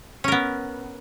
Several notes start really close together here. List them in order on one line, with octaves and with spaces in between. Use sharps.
C#4 A#4 B3